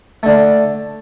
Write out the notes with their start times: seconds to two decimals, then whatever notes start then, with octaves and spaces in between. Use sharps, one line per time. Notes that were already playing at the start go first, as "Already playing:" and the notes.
0.23 A3
0.26 D3
0.28 D4